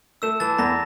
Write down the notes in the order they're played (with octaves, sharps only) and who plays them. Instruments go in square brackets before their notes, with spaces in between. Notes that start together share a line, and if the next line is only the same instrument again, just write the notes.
[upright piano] A3 [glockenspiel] E6 E7
[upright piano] E3 [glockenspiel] A5 A6
[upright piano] E2 [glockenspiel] A#5 A#6